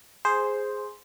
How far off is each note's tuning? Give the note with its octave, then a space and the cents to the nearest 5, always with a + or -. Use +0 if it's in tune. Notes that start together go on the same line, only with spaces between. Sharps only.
G#4 +0 C5 +0